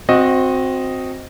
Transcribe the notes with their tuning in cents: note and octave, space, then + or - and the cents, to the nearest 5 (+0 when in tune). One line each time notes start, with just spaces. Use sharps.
C4 +0 F#4 -20 D#5 +0